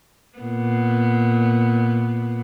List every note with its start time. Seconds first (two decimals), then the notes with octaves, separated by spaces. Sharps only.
0.38 A#2 B3